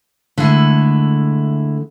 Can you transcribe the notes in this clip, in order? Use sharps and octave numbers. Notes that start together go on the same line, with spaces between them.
D3 G#3 A3 E4